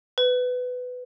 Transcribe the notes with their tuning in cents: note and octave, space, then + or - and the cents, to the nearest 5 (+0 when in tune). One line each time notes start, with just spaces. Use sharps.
B4 +15